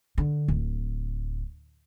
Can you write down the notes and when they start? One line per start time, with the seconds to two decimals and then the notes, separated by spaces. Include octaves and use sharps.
0.18 D3
0.48 D1